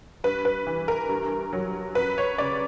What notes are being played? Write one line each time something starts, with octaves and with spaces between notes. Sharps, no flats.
G2 B4
B4
E3
A#4
G2
F#3
F#2 B4
C#5
C#3 D5